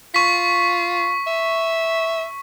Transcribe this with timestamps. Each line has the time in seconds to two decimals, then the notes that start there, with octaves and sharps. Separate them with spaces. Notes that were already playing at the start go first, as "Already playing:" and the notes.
0.14 F4 C#6 B6
1.27 E5